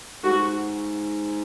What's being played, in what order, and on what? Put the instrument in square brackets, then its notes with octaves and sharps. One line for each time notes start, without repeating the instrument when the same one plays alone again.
[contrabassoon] G#2 [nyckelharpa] F#4